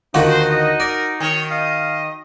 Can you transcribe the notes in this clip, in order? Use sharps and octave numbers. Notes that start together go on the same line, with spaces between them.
D2 D#3 D#4 F4 F#4
C5
D#5
A#4 D5
D#3 C#5
D#5 F5